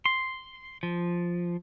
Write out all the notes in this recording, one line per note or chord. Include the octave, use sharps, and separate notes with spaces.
C6
F3